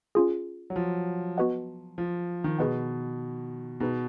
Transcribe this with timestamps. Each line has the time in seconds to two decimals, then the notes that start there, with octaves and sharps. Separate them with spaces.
0.15 C#4 F4 G#4
0.70 F#3
0.76 F3
1.38 B3 F#4 B4 D#5 F#5
1.98 F3
2.44 D#3
2.58 B2 G#4 B4 D#5 F#5
3.80 B2 D#4 G#4 B4